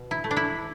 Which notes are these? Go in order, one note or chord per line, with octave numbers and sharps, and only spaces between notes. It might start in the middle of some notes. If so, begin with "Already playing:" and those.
Already playing: B2
E4
A3
D4
E4